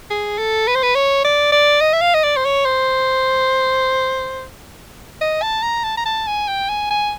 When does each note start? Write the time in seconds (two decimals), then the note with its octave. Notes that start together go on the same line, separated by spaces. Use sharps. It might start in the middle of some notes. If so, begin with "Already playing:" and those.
0.11 G#4
0.39 A4
0.68 B4
0.75 C5
0.83 B4
0.95 C#5
1.25 D5
1.52 D5
1.81 D#5
1.93 E5
2.01 F5
2.14 D#5
2.24 D5
2.37 C5
2.45 C#5
2.65 C5
5.21 D#5
5.42 A5
5.63 A#5
5.84 A5
5.98 A#5
6.06 A5
6.27 G#5
6.48 G5
6.69 G#5
6.91 G#5